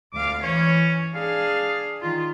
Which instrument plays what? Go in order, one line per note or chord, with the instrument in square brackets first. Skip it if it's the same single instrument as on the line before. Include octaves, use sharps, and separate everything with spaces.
[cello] D2 F5 [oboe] D6
[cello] E3 C#5 [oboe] C#4
[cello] D4 G#4 [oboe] F5
[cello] D#3 F4